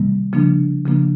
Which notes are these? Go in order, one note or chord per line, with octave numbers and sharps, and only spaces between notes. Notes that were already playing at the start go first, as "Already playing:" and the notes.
Already playing: C3 D#3 G3 A#3
C#3 F3 A#3 D4
C#3 F3 A#3 D4